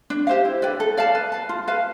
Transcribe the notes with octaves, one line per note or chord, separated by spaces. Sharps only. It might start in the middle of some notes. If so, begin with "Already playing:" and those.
D4
G4 C5 F5
E4
B4 D5 G5
A4
D5 F5 A5
B4
F5 A5
F4
B4 F5 A5